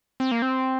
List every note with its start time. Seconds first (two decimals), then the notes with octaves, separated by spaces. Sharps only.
0.20 C4
0.32 A#3
0.42 C4